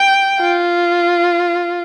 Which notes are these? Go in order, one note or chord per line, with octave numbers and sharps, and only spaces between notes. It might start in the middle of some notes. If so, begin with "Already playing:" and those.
Already playing: G5
F4